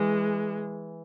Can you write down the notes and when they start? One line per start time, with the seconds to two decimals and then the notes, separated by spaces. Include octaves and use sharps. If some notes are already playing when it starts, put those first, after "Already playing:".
Already playing: E3 G#3